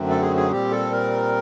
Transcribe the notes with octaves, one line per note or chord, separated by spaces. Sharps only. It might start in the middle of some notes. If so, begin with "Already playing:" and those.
Already playing: F#2 D3 F#3 A3 C4
A4
G#4
G#4
A#2 G3 C4 G4
A4
A#4